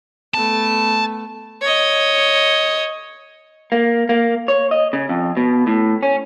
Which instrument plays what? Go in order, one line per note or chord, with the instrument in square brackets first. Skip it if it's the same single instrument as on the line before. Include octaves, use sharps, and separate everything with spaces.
[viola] A3 B3 [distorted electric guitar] A5
[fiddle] C#5 D#5
[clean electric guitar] A#3
A#3
C#5
D#5
C#3
F2
B2
A2
C#4